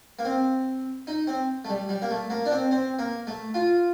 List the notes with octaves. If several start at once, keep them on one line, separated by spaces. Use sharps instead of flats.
A#3
C4
D#4
C4
A3
G3
G3
A#3
A3
A#3
D4
C4
C4
A#3
A3
F4